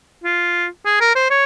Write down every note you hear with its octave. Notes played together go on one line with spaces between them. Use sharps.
F4
G#4
A#4
C5
C#5